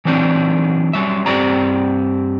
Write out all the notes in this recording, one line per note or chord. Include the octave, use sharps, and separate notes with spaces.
E3 F#3 C4 D4 D#4
F#3 G3 E5
G2 C4 G4 D5 A#5